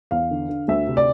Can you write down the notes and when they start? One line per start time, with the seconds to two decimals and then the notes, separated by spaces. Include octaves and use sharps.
0.11 E2 F5
0.31 D3
0.49 D3
0.68 D2 E5
0.87 C3
0.97 D5